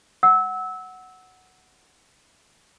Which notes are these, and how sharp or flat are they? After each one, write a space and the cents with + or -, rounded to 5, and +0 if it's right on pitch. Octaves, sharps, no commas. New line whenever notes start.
F#5 +0 E6 -20